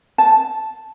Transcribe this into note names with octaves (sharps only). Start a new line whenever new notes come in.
A5